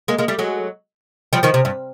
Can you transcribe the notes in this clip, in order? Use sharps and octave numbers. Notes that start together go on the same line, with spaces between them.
G#3 A#3
G#3 A#3
G3 A3
F#3 G#3
F3 G3
D#3 F3
C3
G2